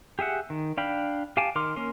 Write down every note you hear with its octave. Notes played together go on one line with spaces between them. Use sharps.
G4 G#4 E5 F#5
D#3
D4 F5 G5 B5
G4 F5 G#5 A5 D6
D#3 A#4 C6 D6 F6
A#3 C#4 A#4 C6